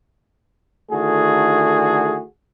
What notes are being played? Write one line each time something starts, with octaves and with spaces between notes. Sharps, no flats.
D3 D#3 A3 E4 F#4 G#4